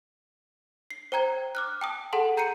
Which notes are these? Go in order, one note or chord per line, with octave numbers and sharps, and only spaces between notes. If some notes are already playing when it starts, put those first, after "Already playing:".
C7
C5 G5 A#5 G#6
D6 F6 F#6
G5 A5 D#6
G#4 A4 F#5 A5 C6
G5 A#5 G6 C7 C#7 D#7